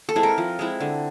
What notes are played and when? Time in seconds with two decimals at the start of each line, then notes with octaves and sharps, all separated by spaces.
0.09 A4
0.16 G#3 C4 E4
0.23 A#4
0.38 F3
0.59 G#3 C4 E4
0.80 D3